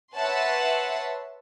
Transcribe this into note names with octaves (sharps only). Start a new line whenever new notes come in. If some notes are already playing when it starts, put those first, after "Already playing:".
B4 C#5 E5 F#5 A5 C6